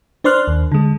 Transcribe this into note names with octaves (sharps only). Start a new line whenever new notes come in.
D4 C5 D5 C6 F6 F#6
D#2
D3 G#3